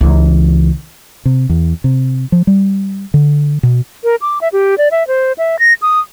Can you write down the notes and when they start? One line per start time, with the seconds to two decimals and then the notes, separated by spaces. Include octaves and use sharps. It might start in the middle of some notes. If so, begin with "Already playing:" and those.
0.01 C#2 E3
1.25 C3
1.49 E2
1.84 C3
2.32 F3
2.47 G3
3.14 D3
3.63 B2
4.04 A#4
4.21 D6
4.41 E5
4.53 G4
4.78 D5
4.91 E5
5.08 C5
5.38 E5
5.59 A#6
5.82 D#6